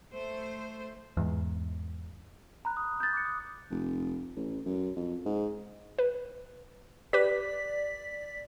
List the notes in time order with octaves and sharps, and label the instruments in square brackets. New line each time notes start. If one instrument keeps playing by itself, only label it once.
[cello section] A3 C5
[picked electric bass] E2 G#2
[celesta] A#5 [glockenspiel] B5 F#6
[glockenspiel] D#6
[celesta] G6 A6
[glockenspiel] D6 F#6 C#7
D#6
[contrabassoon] F1
A1
F#2
F2
G#2
[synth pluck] B4
[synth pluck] G4 B4 [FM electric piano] D5 B6